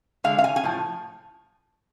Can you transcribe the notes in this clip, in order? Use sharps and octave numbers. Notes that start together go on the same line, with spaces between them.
D3 G#3 F5
F5
G#5
G#5
A2 F3